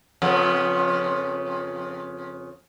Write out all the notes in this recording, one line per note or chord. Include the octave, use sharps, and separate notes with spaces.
F2 C#3 B3